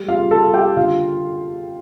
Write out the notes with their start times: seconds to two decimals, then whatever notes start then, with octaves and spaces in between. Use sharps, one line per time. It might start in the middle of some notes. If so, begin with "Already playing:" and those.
Already playing: G3
0.08 F4 F5
0.16 G3
0.31 A4 A5
0.46 G3
0.54 G4 G5
0.77 D3 F4 F5